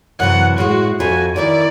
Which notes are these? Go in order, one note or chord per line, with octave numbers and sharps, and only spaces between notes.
F#2 C3 E3 F#5
A2 G#3 F#4
F2 F4 F#4 E5 G#5
D#3 E4 A#4 C#5 D5